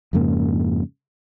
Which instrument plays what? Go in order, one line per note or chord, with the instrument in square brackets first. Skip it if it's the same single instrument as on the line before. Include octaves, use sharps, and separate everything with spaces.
[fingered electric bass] F2 G#2 C#3 A#3